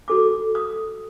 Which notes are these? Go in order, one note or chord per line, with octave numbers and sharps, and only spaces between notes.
F#4 A4 D6
D#6